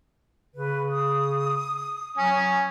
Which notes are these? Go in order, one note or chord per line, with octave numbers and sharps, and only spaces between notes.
C#3 B4
D#6
F#3 C#4 G#5